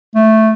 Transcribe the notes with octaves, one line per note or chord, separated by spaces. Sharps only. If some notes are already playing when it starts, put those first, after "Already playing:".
A3